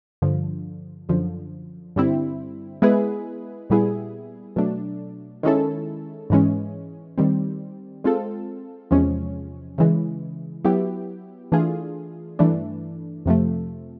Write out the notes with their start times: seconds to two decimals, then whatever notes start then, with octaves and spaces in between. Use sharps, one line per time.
0.22 G2 D3 F3
1.09 F#2 D3 F3
1.96 G2 D3 G3 C4 E4
2.82 G#3 B3 E4 G#4 B4
3.70 A#2 G3 B3 E4 G#4
4.56 B2 F#3 A3 D4
5.43 D#3 G#3 C#4 E4 A4
6.30 G#2 E3 G#3 C#4
7.18 D#3 G3 C4
8.04 G#3 C4 F4 A4
8.91 E2 C3 F3 G#3 C#4
9.78 C#3 E3 G#3
10.65 F#3 B3 E4 G4
11.52 E3 A3 D4 F4 G#4
12.39 G2 E3 A3 D4
13.26 F2 C3 F3 A3